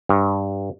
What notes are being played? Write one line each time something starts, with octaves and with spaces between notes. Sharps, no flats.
G2